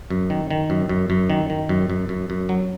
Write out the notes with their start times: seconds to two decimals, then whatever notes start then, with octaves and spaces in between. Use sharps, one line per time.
0.10 F#2
0.30 D#3
0.51 D#3
0.70 F#2
0.89 F#2
1.10 F#2
1.30 D#3
1.50 D#3
1.69 F#2
1.90 F#2
2.09 F#2
2.30 F#2
2.49 F#3